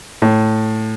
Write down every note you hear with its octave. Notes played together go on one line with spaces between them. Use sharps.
A2